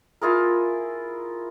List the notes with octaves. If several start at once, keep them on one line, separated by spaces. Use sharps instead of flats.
E4 F4 G#4 A#4